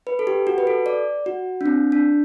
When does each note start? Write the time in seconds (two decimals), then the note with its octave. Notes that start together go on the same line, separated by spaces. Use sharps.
0.07 B4
0.19 A4
0.27 G4
0.47 F#4
0.58 B4
0.67 A4
0.86 D5
1.26 F#4
1.61 D4
1.66 C4
1.92 D4